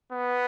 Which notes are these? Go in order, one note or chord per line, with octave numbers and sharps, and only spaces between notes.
B3